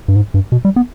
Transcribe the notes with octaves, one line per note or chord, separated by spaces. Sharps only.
G2
G#2
G2
B2
G3
B3